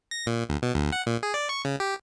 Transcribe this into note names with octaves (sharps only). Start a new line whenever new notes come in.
A#6
A#2
D2
B2
D2
F#5
A#2
G#4
D5
C#6
C#3
G4